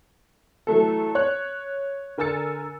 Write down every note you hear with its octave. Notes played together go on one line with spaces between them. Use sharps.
E3 F#3 A3 A4
C#5 F#6
D3 A#4 G#5 E6 A6 C#7